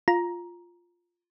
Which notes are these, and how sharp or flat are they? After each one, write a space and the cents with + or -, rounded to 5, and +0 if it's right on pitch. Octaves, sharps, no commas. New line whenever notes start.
F4 +0 A#5 +10